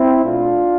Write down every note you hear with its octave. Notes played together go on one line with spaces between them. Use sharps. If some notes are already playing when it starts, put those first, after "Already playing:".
Already playing: C4 E4
B2 A3 D4 F4